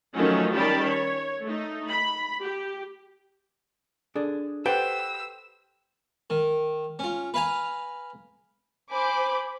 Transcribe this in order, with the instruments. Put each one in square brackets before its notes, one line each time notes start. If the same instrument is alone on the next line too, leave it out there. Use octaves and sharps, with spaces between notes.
[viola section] D#3 F3 F#3 A3 C#4 D#4
D#3 G3 C#4 G4 A5 B5
C#5
A3 D#4
B5
G4
[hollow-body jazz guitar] D4 G#4 A4
[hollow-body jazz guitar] G4 A4 F#5 [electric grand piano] B4 C5 [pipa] G5 [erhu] E6
[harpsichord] D#3
C#4 F4
B4 F5 G#5 A#5
[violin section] C5 G#5 B5 D6